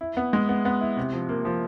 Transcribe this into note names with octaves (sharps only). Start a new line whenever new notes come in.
E4
B3
G#3
B3
B3
E4
C3
F3
A#3
F3